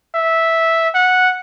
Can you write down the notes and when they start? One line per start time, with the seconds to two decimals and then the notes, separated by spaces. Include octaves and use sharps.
0.15 E5
0.95 F#5